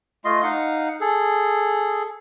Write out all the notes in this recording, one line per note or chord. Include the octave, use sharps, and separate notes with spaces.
A3 F4 D#5 C6
D#4 F5 F#5
G#4 A4